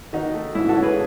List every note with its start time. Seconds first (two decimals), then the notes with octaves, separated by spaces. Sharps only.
0.13 D#3 D#4 F#4
0.34 A3
0.55 G#2 E4
0.69 F#4 A4
0.76 C#4
0.83 G#4 B4